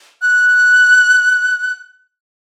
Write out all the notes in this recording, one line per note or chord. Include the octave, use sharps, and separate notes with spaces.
F#6